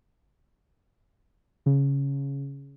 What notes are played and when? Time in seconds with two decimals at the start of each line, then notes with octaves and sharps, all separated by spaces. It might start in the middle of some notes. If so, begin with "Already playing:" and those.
1.66 C#3